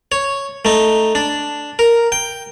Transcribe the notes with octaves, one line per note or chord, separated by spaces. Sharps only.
C#5
A3 D#4
D4
A#4
G5